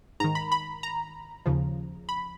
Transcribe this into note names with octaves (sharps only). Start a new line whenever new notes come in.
G#2 D#3 A#5
B5
B5
A#5
D#2 C#3 F3
B5